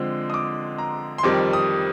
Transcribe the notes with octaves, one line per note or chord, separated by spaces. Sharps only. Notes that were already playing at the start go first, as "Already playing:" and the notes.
Already playing: D3 F3 G#3 C4
D#6
D6
A#5
C6
F2 D#3 G3 C4 D6
D#6